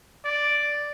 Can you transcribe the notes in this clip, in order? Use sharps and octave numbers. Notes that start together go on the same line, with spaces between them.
D5